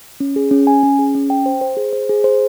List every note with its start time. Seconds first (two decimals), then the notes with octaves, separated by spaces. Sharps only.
0.20 C#4
0.36 G#4
0.51 C#4
0.67 G#5
0.83 C#4
0.99 G#4
1.15 C#4
1.30 G5
1.46 C5
1.61 C5
1.77 G#4
1.93 C5
2.09 G#4
2.24 C5